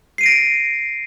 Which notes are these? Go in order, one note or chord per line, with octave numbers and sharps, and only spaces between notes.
A#6 C7 D7 D#7